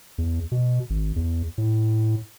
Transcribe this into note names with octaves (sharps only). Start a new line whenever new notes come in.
E2
B2
G#1
E2
A2